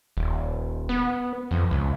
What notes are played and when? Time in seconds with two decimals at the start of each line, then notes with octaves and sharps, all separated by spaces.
0.17 D#1
0.89 B3
1.51 F2
1.71 C#2